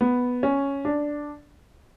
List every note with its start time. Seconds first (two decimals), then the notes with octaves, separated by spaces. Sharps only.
0.01 B3
0.43 C#4
0.85 D4